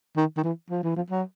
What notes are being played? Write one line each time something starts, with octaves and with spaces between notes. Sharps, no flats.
D#3
D#3
E3
F3
E3
F3
F#3